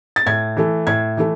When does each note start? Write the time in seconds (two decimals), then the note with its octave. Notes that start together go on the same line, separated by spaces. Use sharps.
0.16 A6
0.26 A2 G#6
0.57 E3 A3
0.87 A2 G#6
1.17 E3 A3